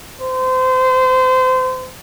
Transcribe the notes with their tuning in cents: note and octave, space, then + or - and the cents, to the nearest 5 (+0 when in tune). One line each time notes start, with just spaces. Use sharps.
C5 -30